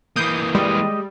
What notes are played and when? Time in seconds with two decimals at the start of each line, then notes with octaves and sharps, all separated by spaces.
0.16 E3 A#3 D#6 G6
0.55 G3 G#3 D#5